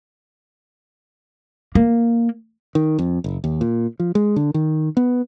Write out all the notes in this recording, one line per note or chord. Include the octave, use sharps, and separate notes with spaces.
A#3
D#3
F2
F#1
D#2
A#2
F3
G#3
D3
D#3
B3